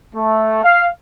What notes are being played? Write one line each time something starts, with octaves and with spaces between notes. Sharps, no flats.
A3
F5